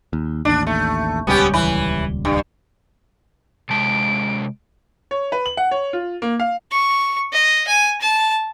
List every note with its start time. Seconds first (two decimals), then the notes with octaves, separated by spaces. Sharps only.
0.13 D#2
0.45 A1 D#2 D4
0.67 A3
1.27 D#1 C#2 G3 B3 C#4 G4
1.54 E3 B4
2.25 G2
3.70 C3 G#3 A5 D7
5.11 C#5
5.32 B4
5.46 F#7
5.57 F#5
5.71 C#5
5.93 F4
6.22 A#3
6.40 F5
6.71 C#6
7.32 D#5
7.67 G#5
8.01 A5